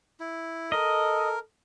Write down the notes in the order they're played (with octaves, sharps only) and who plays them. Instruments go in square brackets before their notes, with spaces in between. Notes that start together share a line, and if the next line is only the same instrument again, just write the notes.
[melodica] E4
[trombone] A4 [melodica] A#4 [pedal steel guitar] D#5